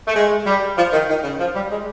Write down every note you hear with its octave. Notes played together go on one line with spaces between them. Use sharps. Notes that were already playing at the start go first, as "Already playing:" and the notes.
A3
G#3
G3
F3
D#3
D#3
C#3
F3
G3
G#3